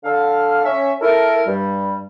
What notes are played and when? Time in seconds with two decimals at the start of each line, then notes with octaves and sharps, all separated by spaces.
0.04 D3 A4 F5
0.65 C#4 E5
1.01 E4 A4 A#4
1.46 G2 G3